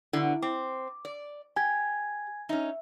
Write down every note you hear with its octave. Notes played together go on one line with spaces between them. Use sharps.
B2 D3 E4
C4 D6
D5
G4 G#5 G#6
C#4 D#4 E5